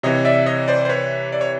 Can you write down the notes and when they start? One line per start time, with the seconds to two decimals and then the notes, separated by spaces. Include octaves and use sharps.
0.03 C3 E3 C#5 D#5
0.25 D5 E5
0.46 C#5 D#5
0.68 C5 D5
0.85 C5
0.89 B4 C#5
1.32 D5
1.41 C#5